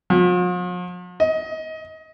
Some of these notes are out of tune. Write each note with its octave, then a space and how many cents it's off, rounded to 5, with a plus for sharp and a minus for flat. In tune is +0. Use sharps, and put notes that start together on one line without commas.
F3 +45
D#5 +25